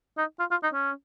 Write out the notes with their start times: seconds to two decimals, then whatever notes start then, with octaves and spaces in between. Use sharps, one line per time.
0.17 D#4
0.39 F4
0.51 F4
0.63 D#4
0.74 C#4